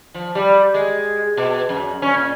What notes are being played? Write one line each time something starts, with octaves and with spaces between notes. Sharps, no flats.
F3
G3
G#3
B2
F#2
C#4
A#2